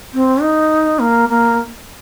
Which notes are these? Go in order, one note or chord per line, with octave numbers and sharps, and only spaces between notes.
C4
D#4
A#3
A#3